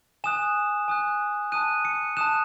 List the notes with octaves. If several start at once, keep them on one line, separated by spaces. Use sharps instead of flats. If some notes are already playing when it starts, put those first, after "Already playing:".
G#5 D#6 F#6 E7
G#5 D#6 F#6
A5 D#6 F#6 D#7
C#7
A5 D#6 F#6 E7